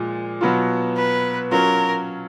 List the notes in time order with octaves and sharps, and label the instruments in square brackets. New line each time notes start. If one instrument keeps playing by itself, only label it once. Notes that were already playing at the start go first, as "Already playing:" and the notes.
Already playing: [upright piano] A#2 F3 G#3
B2 F#3 B3 F4
[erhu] B4
[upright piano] F#3 C#4 F4 [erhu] A#4